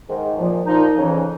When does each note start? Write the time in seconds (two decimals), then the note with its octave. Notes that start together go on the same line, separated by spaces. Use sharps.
0.09 G#2 D#3
0.38 A#2 F3
0.66 A#2 F3 D#4
0.95 F2 C#3 E3